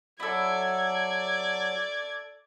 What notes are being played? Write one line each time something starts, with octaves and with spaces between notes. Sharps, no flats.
F#3 E4 F#4 A4 D5 G#6